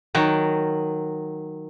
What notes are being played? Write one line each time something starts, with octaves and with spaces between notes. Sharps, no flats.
D#3 F#3